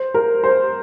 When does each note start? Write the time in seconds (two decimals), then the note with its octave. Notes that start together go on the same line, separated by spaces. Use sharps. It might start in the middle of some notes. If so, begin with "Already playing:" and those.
Already playing: C5
0.14 A#4
0.44 C5